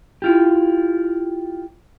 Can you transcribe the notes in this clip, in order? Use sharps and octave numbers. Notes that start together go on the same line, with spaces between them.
E4 F4 G4